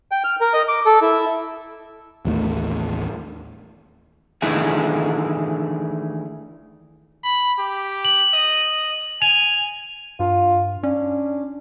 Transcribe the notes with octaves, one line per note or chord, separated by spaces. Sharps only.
G5
F6
A#4
D#5
D6
A4
E4
A1 D#2 A2 A3
D#3 E3 A3 D4 E4 G#4
B5
G4
F#7
D#5
G#5 F7
G2 F4
C#4 D4